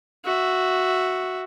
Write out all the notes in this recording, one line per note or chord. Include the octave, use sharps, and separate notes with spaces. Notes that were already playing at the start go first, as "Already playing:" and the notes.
F#4 E5